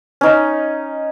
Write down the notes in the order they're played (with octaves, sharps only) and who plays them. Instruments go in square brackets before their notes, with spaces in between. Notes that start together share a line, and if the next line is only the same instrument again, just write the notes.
[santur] C#4 D#4